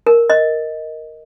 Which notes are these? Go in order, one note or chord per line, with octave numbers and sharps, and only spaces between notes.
A#4
D#5